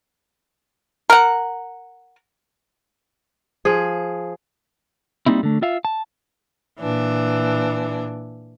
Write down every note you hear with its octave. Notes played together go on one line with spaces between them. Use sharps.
A#4 F#5
F3 G#4
G3 A#3 C4 D#4 E4
D3 A3
F4 E5 F5
A5
A#2 E3 D4